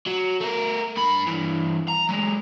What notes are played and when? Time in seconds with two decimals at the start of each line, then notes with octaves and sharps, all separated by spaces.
0.07 F#3
0.41 A3 A#4
0.97 G2 B5
1.27 G2 E3
1.88 A#5
2.09 F#3 G#3